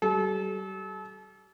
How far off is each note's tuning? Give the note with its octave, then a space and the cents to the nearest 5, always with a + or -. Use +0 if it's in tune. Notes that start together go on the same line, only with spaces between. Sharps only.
G3 -40 A4 -40